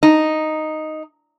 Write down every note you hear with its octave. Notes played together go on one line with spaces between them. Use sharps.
D#4